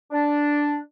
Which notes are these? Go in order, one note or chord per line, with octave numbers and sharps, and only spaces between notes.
D4